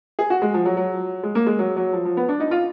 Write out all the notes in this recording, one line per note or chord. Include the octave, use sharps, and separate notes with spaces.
G#4
F#4
G#3
F3
F#3
F#3
G#3
A#3
G#3
F#3
F#3
F3
F3
B3
D4
D#4
F4